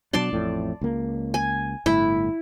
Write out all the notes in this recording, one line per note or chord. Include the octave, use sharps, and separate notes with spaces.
B2 F#3 D4 D5 A5 C6
A1 F2 A2
C#2 A#3
G#5
G1 A2 E4